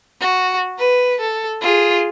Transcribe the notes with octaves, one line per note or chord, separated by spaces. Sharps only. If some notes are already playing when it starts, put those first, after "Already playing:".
F#4
B4
A4
F4 G#4